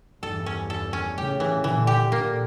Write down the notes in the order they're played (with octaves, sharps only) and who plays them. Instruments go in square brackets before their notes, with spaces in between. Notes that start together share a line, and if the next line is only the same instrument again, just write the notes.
[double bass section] E2 G2 [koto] A4
[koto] C#4
A4
C#4
[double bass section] A2 C#3 [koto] G4
[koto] E3
[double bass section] A#2 D3 [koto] E3
[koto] G4
[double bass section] A#2 D3 [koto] A#3